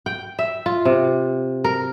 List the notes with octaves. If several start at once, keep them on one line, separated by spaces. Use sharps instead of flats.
G5
E5
F4
C3
A#4